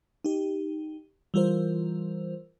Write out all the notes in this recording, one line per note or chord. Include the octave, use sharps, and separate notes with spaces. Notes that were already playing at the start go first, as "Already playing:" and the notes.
D#4 G4
E3 G3 F4 A#4 C5